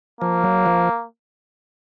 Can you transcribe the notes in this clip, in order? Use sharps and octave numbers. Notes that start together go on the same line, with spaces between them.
F3 A#3
F#3
F3